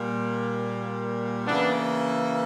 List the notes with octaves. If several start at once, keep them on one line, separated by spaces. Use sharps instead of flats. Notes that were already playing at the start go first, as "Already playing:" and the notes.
Already playing: A#2 G3 A#3
C#3 E3 A#3 B3 D4